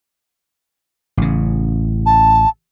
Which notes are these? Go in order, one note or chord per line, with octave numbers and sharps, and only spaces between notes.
A1 C#3
A5